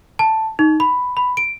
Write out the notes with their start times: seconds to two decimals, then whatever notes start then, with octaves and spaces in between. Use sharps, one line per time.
0.19 A5
0.59 D#4
0.80 B5
1.17 B5
1.37 D7